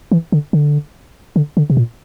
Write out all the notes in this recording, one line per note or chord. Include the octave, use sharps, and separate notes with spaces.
E3
D3
D3
D3
D3
C3
A#2